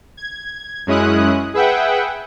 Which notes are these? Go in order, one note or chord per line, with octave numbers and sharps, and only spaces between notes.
G#6
F#2 G#3 C#4 E4 D#6 F#6
G#4 B4 E5 F#5 G5